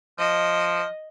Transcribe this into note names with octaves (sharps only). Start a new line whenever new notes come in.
F3 D#5